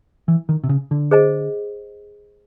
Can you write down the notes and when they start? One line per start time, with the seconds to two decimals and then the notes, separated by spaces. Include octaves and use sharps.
0.28 E3
0.49 D#3
0.64 C3
0.69 C#3
0.91 D3
1.11 G#4 C5 D#5 G#5